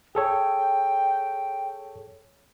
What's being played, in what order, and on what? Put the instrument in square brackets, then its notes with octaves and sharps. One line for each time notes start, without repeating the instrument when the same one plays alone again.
[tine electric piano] G#4 A4 C#5 [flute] G5